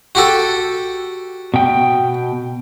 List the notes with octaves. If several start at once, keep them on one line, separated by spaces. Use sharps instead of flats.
F#4 G4 A4
B2 G5